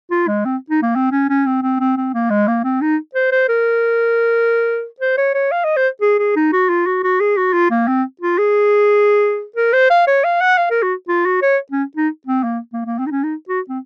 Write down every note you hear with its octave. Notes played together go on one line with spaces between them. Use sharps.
F4
G#3
C4
D#4
A#3
C4
C#4
C#4
C4
C4
C4
C4
A#3
G#3
A#3
C4
D#4
C5
C5
A#4
C5
C#5
C#5
F5
D#5
C5
G#4
G#4
D#4
F#4
F4
F#4
F#4
G#4
F#4
F4
A#3
C4
F4
G#4
A#4
C5
F5
C#5
F5
F#5
F5
A#4
F#4
F4
F#4
C#5
C#4
D#4
C4
A#3
A#3
A#3
C4
D#4
C#4
D#4
F#4
C4